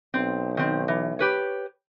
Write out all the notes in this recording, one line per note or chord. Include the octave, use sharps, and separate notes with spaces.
B1 C4
D#3 C4
E3
G4 B4 C#5